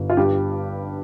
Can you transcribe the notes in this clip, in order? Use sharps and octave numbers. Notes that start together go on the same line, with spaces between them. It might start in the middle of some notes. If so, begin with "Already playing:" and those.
Already playing: G1
F4
G2 G4